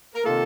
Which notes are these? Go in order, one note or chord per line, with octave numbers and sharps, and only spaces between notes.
A#4
C3 D#3 A#3 F4 A4